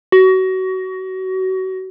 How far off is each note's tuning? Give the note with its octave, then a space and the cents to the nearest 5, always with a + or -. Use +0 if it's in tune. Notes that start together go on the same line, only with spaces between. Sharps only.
F#4 +25